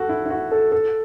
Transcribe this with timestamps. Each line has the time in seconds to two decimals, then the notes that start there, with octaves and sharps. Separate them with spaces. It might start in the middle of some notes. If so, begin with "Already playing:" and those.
Already playing: F#4 A4
0.09 E4
0.26 E4
0.30 F#4
0.52 A4
0.72 A4